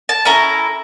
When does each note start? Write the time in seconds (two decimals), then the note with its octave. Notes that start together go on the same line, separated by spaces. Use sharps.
0.09 A5
0.25 C#4 E4 A4 A#5